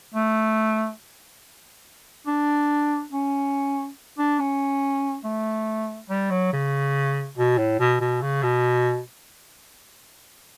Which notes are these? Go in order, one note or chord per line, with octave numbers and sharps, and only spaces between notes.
A3
D4
C#4
D4
C#4
A3
G3
F#3
C#3
B2
A2
B2
B2
C#3
B2